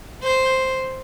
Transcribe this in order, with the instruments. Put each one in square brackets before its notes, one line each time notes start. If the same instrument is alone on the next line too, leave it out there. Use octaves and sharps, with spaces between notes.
[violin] C5